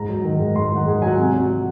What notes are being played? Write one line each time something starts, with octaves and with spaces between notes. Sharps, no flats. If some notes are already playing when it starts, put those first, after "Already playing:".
Already playing: G#2 A#5
F#3
D#3
G#2
G#2 C6
D#3 F#5
G#2 G#4
F#3 G#5
F#5
C3
F#3
F#3